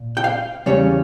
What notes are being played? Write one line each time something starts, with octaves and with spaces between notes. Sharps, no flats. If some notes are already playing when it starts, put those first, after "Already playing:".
Already playing: A#2
G5
F5
E2 C#3 G3 C#4 C#5